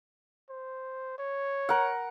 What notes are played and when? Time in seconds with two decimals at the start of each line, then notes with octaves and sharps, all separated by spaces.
0.49 C5
1.18 C#5
1.69 A#4 F#5